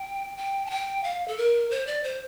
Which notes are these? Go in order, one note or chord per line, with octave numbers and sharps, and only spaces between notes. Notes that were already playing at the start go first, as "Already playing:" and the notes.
Already playing: G5
G5
A5
G5
F5
A4
A#4
C5
D5
C5